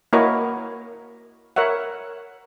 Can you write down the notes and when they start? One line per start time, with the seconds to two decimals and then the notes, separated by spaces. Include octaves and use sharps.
0.13 A#3 E4 F#4 A#4 C#5 D#5
1.56 A#4 C#5 E5 F#5